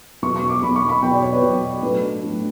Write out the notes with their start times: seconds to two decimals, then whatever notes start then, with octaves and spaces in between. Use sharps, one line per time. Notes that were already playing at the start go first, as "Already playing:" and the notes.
0.22 E2 B2 F#3 B3 C#6
0.36 C#6
0.49 D6
0.62 E2 B2 F#3 B3 B5
0.76 C#6
0.89 B5
1.02 E2 B2 F#3 B3 G5
1.12 D5
1.22 C#5
1.33 B4
1.42 E2 B2 F#3 B3
1.82 A2 F#3 A3 D4 B4
2.22 A2 F#3 A3 D4